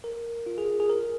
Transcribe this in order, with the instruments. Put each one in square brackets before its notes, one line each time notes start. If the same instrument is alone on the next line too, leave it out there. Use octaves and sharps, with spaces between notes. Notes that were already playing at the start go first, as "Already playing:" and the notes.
[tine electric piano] A#4
F4
G#4
G#4
A#4